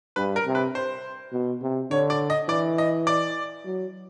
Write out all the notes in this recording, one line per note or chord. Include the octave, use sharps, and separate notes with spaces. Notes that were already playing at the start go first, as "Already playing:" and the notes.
G2 B4
A#4
C3
B4
C5
B2
C3
D3 C#5
D5
D#5
E3 D5
D#5
D5
F#3